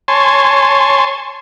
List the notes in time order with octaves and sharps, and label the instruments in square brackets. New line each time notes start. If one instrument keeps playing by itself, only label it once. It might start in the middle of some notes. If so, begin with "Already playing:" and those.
[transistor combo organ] C#5 G#5 A5 C6